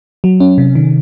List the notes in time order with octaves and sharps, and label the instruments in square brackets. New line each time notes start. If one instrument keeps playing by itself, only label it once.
[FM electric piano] F#3
C#4
C3
D#3